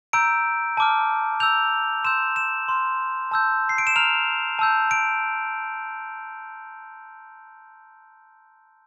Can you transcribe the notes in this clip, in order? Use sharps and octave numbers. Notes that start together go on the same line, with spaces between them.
A#5 E6 G6 D7
A5 D6 F6
A#5 E6 G6 F7
C6 E6 G6 E7
E7
C6 F6
A5 E6 G6
C7
D7
E7
A#5 F6 F7
A5 E6 G6
D7